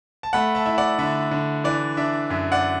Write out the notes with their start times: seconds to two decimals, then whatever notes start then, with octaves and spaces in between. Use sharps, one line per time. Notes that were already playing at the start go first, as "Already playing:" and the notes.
0.23 A5
0.33 A3 F#5 B5
0.55 E5 A5
0.66 E4
0.78 D5 F#5
0.98 D3 E5
1.31 D3
1.64 E3 D5
1.97 D4 E5
2.30 F#2 E5
2.52 D5 F#5